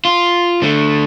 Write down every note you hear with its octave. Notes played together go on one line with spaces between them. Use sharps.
F4
D3 A3